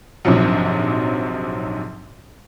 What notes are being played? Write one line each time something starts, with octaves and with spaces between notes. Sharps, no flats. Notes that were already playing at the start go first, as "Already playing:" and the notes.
A#1 G#2 C3 F3 F#3